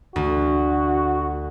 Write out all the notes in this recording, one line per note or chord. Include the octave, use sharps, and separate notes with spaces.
D2 F#4